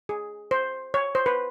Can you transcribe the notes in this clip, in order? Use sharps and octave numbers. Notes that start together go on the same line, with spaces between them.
G#4
C5
C#5
C5
B4